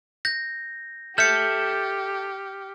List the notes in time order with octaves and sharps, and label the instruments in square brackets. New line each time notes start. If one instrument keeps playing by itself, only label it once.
[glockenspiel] G6 A#6
[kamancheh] G4 [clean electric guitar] A4 E5 [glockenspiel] F6 C#7 [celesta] G6